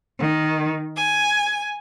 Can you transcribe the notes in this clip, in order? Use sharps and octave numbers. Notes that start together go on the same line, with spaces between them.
D#3
G#5